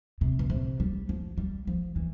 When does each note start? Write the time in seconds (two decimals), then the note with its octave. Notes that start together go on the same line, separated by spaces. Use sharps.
0.21 C3
0.39 B2
0.50 C3
0.80 G3
1.09 F3
1.38 G3
1.67 F3
1.96 E3